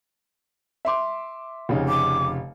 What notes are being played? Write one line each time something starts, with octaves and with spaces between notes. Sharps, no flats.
E5 C6 D6
F1 C#3 D#4
D6